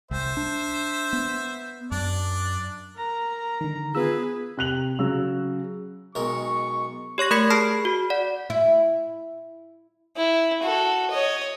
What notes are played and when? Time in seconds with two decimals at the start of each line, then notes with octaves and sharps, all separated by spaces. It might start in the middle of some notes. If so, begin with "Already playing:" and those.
0.11 C2 C5 E5
0.37 D4
1.13 B3
1.92 F#2 D4 D5
2.96 A#4 A#5
3.61 D3 D#3
3.95 B3 F4 G#4 B4 E6
4.57 C3 F#6 F7 F#7
4.99 C#3 F#3 E6
6.15 B1 G#3 A#4 C#6
7.18 G4 C#5 C#6 A#6
7.31 A3 A#4 B5 G#6 B6 C#7
7.50 G#4 A5 B5 F6 C7
7.85 F#4
8.10 D5 F#5
8.50 E4
10.16 E4
10.63 F#4 A4
11.11 C#5 D#5